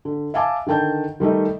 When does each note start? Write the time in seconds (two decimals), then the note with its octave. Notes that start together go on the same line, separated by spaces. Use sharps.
0.05 D3
0.34 E5 F5 G#5 A5 D6
0.67 D3 D#3 G5 A5 G6
1.20 D#3 G3 A3 D#4